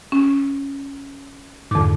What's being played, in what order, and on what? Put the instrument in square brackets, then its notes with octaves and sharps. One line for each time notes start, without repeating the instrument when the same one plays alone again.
[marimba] C#4
[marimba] F2 D6 [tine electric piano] G#2 D3